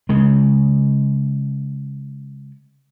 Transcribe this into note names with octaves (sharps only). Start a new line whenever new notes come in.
C#3 G#3